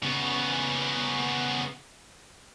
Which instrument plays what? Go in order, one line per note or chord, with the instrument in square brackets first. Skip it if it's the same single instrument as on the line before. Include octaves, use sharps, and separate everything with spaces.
[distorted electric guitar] C#3 B3